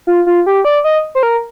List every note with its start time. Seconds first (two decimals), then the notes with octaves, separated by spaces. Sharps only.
0.07 F4
0.26 F4
0.46 G4
0.65 D5
0.84 D#5
1.15 C5
1.23 A#4